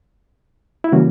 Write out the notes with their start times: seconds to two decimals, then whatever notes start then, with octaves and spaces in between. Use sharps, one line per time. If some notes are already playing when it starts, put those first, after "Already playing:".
0.84 E4
0.92 C#3 E3 G3 A#3 C#4 F#4